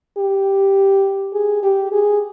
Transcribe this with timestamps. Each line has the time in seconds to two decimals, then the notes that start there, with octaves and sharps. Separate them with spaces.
0.18 G4
1.33 G#4
1.63 G4
1.92 G#4